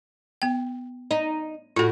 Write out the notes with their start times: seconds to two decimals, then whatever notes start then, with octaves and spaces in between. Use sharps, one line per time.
0.42 B3 G5
1.11 D#4
1.76 A2 F4 F#4 A4